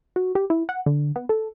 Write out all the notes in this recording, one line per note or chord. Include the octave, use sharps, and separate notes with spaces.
F#4
G4
E4
F#5
D3
B3
A4